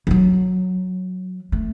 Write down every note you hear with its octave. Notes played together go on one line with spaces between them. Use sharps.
E3
F#3
A3